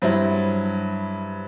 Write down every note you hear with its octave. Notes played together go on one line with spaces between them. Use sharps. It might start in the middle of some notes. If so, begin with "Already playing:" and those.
G2 F#3 C4 E4